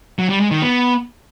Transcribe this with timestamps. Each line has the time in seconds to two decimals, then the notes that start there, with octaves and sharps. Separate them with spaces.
0.19 F#3
0.30 G3
0.40 G#3
0.51 D#3
0.62 B3